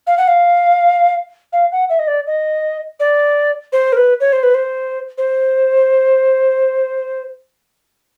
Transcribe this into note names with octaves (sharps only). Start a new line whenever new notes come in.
F5
F#5
F5
F5
F#5
E5
D#5
D5
D#5
D5
C5
A#4
B4
C#5
C5
B4
C5
C5